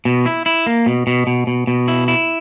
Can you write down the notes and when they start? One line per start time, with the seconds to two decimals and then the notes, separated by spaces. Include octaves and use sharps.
0.05 B2
0.26 E4
0.46 E4
0.66 A#3
0.86 B2
1.07 B2
1.27 B2
1.47 B2
1.67 B2
1.88 E4
2.08 E4